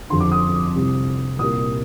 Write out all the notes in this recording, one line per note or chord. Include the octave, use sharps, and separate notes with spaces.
G1 F2 D3 C6
D6
D#6
C2 C3 G3 C4
C2 A#2 G3 A#3 D#6